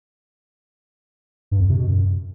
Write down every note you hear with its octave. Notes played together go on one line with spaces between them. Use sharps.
G2
F2
C3
B2
F#2